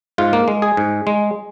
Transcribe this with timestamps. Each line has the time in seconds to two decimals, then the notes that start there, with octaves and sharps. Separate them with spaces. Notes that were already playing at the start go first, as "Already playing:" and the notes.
0.18 G#2 F4
0.33 A#3
0.48 G#3
0.62 G#4
0.77 G#2
1.07 G#3